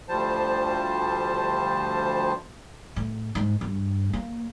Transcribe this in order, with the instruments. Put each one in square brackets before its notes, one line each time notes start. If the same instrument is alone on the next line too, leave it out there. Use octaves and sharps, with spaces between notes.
[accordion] D2 F3 G3 C5 A5
[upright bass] A2
G#2
G2
A#3